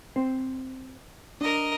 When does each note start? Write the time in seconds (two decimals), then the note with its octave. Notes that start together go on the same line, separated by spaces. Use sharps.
0.16 C4 C5
1.41 D4 A#4 D#5 A#5